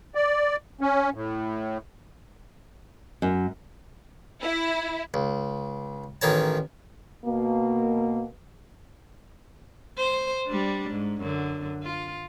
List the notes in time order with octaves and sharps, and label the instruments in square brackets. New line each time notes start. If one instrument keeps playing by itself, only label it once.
[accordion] D5
C#4
A2
[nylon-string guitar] F#2
[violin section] E4
[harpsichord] C#2
A1 D#3 C#5 A5
[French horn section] B2 A#3
[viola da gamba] C5
G3 D4
G#2
F#2 D3
F4